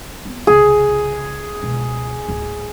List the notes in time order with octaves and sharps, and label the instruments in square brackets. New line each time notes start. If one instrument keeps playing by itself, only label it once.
[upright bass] B3 C4
[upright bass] C2 C#3 [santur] G#4
[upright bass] C#2 B2
D1